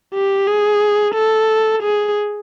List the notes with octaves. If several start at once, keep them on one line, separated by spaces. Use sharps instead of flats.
G4
G#4
A4
G#4